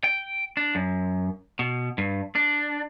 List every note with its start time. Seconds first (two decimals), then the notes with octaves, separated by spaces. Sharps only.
0.04 G5
0.57 D4
0.75 F#2
1.59 B2
1.98 G2
2.35 D4